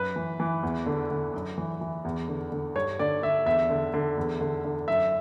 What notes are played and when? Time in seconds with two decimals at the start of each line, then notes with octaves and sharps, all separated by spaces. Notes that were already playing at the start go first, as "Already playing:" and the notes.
Already playing: F#2 B4
0.16 E3
0.40 E3
0.63 E2
0.86 D3
1.10 D3
1.34 F#2
1.58 E3
1.81 E3
2.05 E2
2.28 D3
2.52 D3
2.75 G2 C#5
2.99 D3 D5
3.23 D3 E5
3.46 E2 E5
3.70 D3
3.94 D3
4.17 E2
4.41 D3
4.65 D3
4.88 F#2 E5